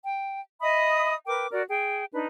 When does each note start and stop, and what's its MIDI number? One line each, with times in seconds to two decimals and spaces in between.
0.04 0.40 79
0.61 1.14 75
0.61 1.14 76
0.61 1.14 83
0.61 1.14 87
1.27 1.46 70
1.27 1.46 71
1.27 1.46 79
1.27 1.46 86
1.51 1.62 66
1.51 1.62 70
1.51 1.62 74
1.69 2.05 68
1.69 2.05 79
2.13 2.27 62
2.13 2.27 63
2.13 2.27 71